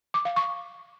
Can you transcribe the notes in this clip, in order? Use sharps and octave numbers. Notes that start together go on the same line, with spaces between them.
D6
F5
C#6